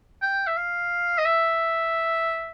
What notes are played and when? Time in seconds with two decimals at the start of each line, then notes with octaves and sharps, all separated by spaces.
0.22 G5
0.47 E5
0.57 F5
1.18 D#5
1.25 E5